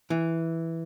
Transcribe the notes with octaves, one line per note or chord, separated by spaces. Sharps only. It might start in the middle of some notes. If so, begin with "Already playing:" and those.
E3